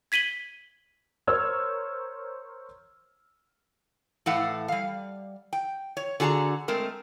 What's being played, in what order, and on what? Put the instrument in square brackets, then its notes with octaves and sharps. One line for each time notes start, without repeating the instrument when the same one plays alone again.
[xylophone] G#6 B6 D#7 F#7 G7
[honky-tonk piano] A#4 C5 C#5 E6 F6 G#6
[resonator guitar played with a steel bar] A2 E3 A4 F5 F#5
G3 F5
G5
C#5
D3 F#4 G#4 A5 A#5
G#3 A3 C4 A#4